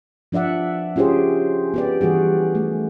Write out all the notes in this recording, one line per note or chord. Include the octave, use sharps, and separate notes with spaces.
F3 D4 D5 E5 F#5
C#4 F4 G4 G#4 C5
B3 G4 D5
E3 G3 F#4 G#4
A3